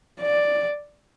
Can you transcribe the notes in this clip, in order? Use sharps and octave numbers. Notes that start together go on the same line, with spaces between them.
D5